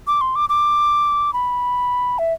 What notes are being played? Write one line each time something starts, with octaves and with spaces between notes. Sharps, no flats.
D6
C6
D6
D6
B5
E5